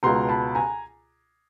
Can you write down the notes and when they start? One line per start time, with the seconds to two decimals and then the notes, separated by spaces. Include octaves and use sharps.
0.03 C#2 B2 A#5 C6
0.29 A5 B5
0.55 G#5 A#5